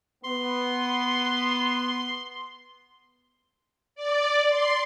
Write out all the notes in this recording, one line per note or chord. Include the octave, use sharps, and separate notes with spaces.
B3 C6
D5
C6